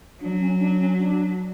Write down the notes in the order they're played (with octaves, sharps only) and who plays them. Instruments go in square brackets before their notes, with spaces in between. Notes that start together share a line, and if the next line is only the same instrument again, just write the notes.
[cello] F#3 [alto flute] D4
[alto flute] C#4
D4
C#4
D4